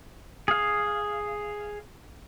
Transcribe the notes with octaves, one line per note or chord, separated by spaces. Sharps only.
G#4 F5